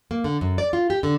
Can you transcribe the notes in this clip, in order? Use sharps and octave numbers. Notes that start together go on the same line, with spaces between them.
A#3
D3
F#2
D5
F4
G4
D3